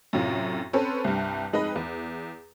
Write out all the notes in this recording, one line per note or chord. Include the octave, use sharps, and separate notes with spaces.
F#2 A2 C3 F4
C4 C#4 A4 B4 C5
C2 G2
F2 G#3 D#4 B4 D#5 B5
E2